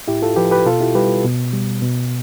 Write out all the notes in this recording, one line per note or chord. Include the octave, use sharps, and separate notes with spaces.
A2 E4 G4
F4 A4
F3 G4 B4
G4 B4
B2 F4 A4
E4 G4
G3 G4 B4
B2
G3
B2